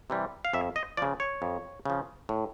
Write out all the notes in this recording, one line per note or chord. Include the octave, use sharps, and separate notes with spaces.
C3 E3 G3
F5
F2 E5
D#5
C#3 F3 D5
C#5
F2
C#3 F3
A2